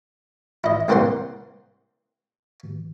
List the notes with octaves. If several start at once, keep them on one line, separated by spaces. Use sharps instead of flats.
E4 D#5
C2 A#3 C4 C5 F#5 C6